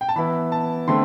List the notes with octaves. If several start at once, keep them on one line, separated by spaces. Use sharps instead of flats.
G5
A5
E3 B3 E4 B5
A5
D3 A3 C4 C6